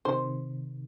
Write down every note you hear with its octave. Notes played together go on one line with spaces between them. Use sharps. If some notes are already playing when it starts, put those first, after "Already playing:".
C3 D#3 C5